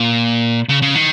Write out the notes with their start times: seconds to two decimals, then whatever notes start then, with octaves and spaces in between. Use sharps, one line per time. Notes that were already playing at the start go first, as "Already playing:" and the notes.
Already playing: A#2
0.69 C#3
0.82 C#3
0.95 D#3